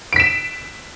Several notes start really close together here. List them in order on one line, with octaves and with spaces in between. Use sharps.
D7 B6 E7